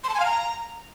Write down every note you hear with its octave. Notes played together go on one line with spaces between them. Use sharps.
C6
A5
G#5
F5
A#5